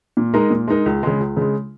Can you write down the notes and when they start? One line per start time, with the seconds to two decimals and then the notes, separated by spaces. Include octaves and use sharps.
0.17 A#2
0.34 G#3 D#4 A#4
0.50 A#2
0.68 G#3 D#4 A#4
0.86 C#2
1.03 C#3 G#3
1.20 C#2
1.37 C#3 G#3